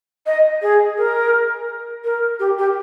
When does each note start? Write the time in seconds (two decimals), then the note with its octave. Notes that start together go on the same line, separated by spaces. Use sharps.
0.26 D#5
0.62 G#4
0.98 A#4
2.04 A#4
2.39 G4
2.58 G4